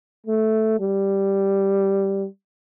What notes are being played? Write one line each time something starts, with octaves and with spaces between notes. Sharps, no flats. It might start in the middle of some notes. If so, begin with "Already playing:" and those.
A3
G3